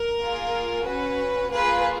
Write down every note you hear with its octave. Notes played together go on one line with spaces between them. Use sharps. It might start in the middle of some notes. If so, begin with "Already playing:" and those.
Already playing: A#4
A#3 F4 G#4
C#4 F#4 B4
A#3 F4 G#4 B4